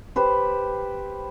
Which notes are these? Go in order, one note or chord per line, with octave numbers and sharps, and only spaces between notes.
G4 B4 C5